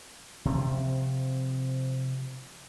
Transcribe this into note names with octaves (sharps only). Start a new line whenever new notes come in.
C3 F3 C4